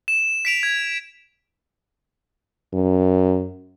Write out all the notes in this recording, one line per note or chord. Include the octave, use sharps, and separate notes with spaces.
E7
B6 D7 F7
G#6
F#2